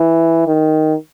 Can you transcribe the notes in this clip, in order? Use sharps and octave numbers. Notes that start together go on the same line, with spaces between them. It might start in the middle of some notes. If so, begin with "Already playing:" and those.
Already playing: E3
D#3